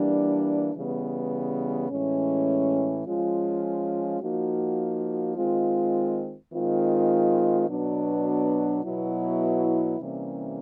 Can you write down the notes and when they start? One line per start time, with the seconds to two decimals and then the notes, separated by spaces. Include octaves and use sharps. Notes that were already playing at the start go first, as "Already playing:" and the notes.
Already playing: E3 G3 A#3 D4
0.74 C#3 E3 G3 B3
1.90 A2 E3 G#3 C#4
3.06 F3 G#3 C#4 F4
4.22 F3 A#3 D#4 F#4
5.36 D#3 G#3 C4 F4
6.52 D#3 G#3 C4 F4
7.69 B2 F#3 B3 D4
8.84 B2 F#3 B3 E4
10.00 C3 E3 G3 A#3 C#4